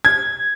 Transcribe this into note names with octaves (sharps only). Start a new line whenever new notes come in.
G#6